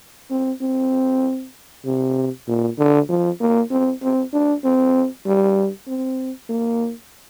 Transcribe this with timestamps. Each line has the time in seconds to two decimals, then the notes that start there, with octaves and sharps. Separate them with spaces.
0.31 C4
0.61 C4
1.86 C3
2.48 A#2
2.78 D3
3.09 F3
3.40 A#3
3.71 C4
4.02 C4
4.33 D4
4.64 C4
5.26 G3
5.88 C4
6.49 A#3